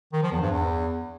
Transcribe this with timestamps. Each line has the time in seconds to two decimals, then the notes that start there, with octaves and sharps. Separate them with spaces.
0.13 D#3
0.22 F3
0.32 E2
0.41 G2
0.51 E2